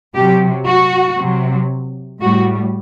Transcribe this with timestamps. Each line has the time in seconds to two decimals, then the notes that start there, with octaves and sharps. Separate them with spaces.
0.15 C3 F#3 G4
0.67 F#4
1.19 C3 F#3
2.21 A2 G3 F#4